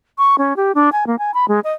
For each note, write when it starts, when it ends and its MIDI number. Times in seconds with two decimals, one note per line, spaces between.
0.18 0.36 85
0.38 0.56 61
0.56 0.72 67
0.75 0.90 62
0.92 1.07 80
1.07 1.18 58
1.19 1.31 80
1.34 1.48 83
1.48 1.60 56
1.64 1.73 75